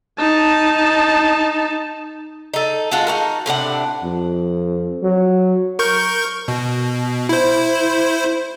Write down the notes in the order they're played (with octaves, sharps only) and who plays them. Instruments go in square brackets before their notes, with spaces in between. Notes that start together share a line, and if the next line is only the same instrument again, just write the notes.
[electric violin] D#4 A5
[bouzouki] D#4 A4
G#3 F4 F#4 A4
D#4 F#4 A#4
A2 C3 D4 F#5
[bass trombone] F2
F#3
[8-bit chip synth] A#4 C#6 G6
B2
E4 C5